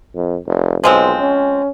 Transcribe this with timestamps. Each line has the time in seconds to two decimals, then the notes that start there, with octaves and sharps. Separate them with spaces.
0.15 F2
0.47 F1
0.84 B1 F3 G#3 C4
1.20 C#4